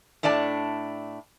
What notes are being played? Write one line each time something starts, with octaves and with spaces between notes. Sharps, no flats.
A2 A3 D4 D5 A5